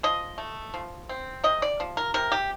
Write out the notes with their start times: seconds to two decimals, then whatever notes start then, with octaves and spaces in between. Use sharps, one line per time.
0.03 F3 D#5
0.38 A3
0.74 F3
1.09 C4
1.44 C3 D#5
1.62 D5
1.80 F3
1.97 A#4
2.14 C3 A#4
2.32 G4